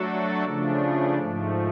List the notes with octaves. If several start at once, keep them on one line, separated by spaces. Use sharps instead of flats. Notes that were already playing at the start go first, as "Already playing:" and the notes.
Already playing: F#3 A3 D4 F#4 A4
C#3 F3 A3 D4
G#2 F3 A3